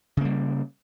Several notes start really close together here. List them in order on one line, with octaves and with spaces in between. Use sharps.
C#3 A#3 G3